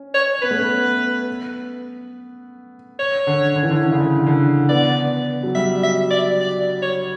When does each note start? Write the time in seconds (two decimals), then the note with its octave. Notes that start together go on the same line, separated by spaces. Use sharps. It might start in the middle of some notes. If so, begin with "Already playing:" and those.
Already playing: C#4
0.14 C#5
0.42 B3 B4
0.51 A3
0.60 B3
2.99 C#5
3.27 D3
3.55 D3
3.63 E3
3.70 D3
3.83 D3
3.92 C#3
3.99 D3
4.27 D3
4.69 B3 D5
5.43 F#3
5.55 G3 E5
5.83 E5
6.11 D5
6.40 D5
6.82 C#5